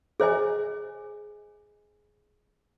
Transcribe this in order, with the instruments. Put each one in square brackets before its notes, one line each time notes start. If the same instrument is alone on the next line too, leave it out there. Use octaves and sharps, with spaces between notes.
[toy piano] G#4 C5 D#5 G#5